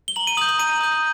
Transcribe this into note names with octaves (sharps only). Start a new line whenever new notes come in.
G7
A#5 F#7
D#7
D#6 G6 F#7
F#7
A#5 D#7
D#6 G6